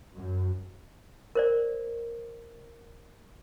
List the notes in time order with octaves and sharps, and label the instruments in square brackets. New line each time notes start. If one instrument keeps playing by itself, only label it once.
[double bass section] F#2
[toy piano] A#4 C5 D5